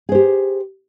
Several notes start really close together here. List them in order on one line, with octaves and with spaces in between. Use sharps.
G#4 C5 G4